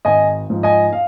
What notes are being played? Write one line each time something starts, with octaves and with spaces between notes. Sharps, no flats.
G#1 D#5 G#5
G#2 F3
D#5 G#5
F5